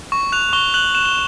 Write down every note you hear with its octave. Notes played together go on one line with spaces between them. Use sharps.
C#6
F#6 F7
C#6 G7
F#6 F#7
F#6 E7
G7